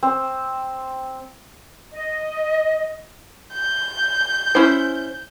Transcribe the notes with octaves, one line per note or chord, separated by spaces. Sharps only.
C4
D#5
G6
C#4 E4 C5